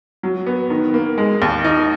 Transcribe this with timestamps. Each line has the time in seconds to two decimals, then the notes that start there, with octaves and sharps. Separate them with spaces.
0.23 F#3
0.46 B3
0.70 D#3
0.94 A#3
1.18 G#3
1.42 D#2
1.64 D#4